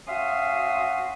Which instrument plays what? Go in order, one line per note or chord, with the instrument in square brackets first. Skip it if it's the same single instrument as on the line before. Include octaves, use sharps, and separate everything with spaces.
[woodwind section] C#4 F#4 E5 F5 C6 D#6